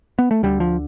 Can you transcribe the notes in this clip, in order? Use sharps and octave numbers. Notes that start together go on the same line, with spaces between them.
B3
A3
D2 D3 G3
F3